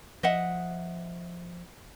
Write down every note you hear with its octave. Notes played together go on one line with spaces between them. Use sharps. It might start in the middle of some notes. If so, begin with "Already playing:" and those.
F3 D#5 E5 F#5